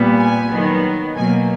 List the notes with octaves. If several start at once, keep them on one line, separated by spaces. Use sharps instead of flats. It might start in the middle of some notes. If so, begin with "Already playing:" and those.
Already playing: A#2 G3 B3
G#5
D#3 F#3 B3
B2 F#3 A#3 G#5